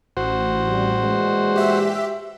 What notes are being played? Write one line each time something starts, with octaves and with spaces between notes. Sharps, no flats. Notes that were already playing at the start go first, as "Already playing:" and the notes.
A1 F#4 C5
F2 G3
A#2 E3 G#3
G4 E5